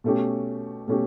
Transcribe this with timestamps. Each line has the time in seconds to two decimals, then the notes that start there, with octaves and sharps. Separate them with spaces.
0.04 B2 A3 C#4 G4
0.87 B2 A3 C#4 G4